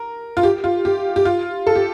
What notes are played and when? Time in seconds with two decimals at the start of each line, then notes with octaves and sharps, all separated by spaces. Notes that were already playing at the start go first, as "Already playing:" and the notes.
Already playing: A#4
0.37 F4
0.43 G4
0.64 F4
0.85 G4
1.16 G4
1.25 F4
1.67 A4
1.75 G4